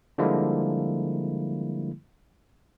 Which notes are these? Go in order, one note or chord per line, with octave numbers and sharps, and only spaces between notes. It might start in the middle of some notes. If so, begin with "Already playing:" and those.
D3 F3 G3 G#3 A#3 E4